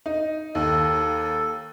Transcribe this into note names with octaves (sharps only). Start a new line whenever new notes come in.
D#4
D#2 A4